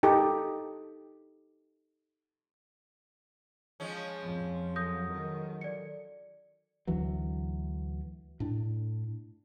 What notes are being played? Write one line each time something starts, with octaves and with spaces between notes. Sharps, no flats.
D#4 G4 A4
F3 G#3 C#4
F2
F#3 A4 D#6 G6 A#6
D#3
D5 C#7
D2 E3 F#3
A2 D4